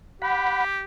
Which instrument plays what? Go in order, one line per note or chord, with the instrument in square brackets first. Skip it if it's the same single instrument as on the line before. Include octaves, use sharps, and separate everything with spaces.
[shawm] G4 [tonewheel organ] F#5 B5